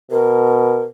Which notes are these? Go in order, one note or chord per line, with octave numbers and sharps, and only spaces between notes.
B2 A#4